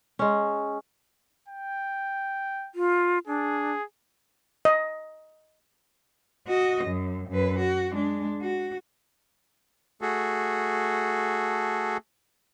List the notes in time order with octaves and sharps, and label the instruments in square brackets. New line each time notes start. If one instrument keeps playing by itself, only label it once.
[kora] G#3 C#4
[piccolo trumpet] G5
[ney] F4
[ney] D4 [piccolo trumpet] G#4
[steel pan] D#5
[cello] F#4 D#5
F#2
F#2 B4
F#4
G#3 D4
F#4
[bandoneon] A3 F#4 G#4 A4